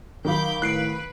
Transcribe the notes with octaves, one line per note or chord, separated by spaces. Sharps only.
D#3 F#3 F5 B5 D6 G6
A2 B4 F#6 C7 D7